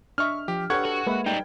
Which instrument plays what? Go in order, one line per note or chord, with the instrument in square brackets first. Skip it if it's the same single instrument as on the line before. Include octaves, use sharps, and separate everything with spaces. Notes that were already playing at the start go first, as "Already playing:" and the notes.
[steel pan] D4 D#5 E5 [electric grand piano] C#6 F6
[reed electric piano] F3 [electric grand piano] G4
[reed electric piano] D4 G4 B4 [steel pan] A4 C#5 [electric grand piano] F#5 C#6 G#6
[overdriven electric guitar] F#4 [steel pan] A4 C#5
[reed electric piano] G#3 A#3 E5 [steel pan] B4
[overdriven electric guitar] G3 D#4 [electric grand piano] G5